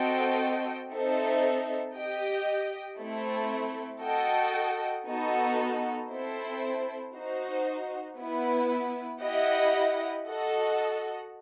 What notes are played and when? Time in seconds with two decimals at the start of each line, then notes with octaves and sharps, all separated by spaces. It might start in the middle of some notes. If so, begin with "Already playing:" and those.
Already playing: C4 F#4 A4 D#5 G5
0.91 C4 D#4 A4 C5 E5
1.94 G4 D#5 G5
2.98 A3 C4 E4 A4
4.02 F#4 A4 D#5 G5
5.07 B3 D#4 F#4 A4
6.10 C4 E4 A4 C5
7.14 D#4 F#4 C5
8.18 B3 E4 B4
9.21 E4 G4 D#5 F#5
10.26 F#4 A4 D#5 F#5